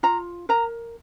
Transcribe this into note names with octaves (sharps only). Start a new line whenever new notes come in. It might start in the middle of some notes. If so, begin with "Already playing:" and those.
F4 A#5
A#4 A#5